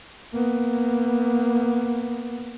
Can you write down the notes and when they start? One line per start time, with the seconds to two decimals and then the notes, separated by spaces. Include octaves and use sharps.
0.33 A#3 B3